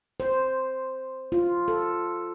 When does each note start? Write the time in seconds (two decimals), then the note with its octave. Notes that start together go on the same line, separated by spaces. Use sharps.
0.20 C5
1.32 F4
1.68 A4